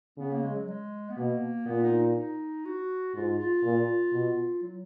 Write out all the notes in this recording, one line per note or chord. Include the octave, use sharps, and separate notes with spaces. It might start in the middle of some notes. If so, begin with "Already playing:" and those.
C#3 B3
A#3
G#3
F#3
G#3
B3
B2 A#3
A#2 B3
D#4
D#4
D#4
F#4
G#2 F4
F4
A#2
B2
F#3